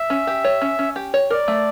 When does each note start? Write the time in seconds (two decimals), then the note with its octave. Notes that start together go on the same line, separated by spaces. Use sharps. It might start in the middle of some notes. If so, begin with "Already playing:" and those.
Already playing: E5
0.10 C#4
0.27 G4
0.45 C#5
0.62 C#4
0.79 C#4
0.96 G4
1.14 C#5
1.30 A#4 D5
1.48 A3